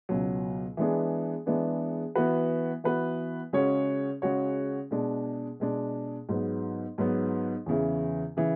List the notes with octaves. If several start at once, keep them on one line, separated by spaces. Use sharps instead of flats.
C#2 B2 F#3
E3 G#3 B3 D4 G#4
E3 G#3 B3 D4 G#4
E3 B3 F#4 B4
E3 B3 F#4 B4
C#3 G#3 C#4 F#4 C#5
C#3 G#3 C#4 F#4 C#5
B2 G#3 D4
B2 G#3 D4
G#2 F#3 B3
G#2 F#3 B3
E2 C#3 E3
C#3 E3